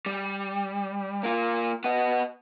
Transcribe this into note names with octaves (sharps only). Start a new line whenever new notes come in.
G3
A#3 F4
B3 D#5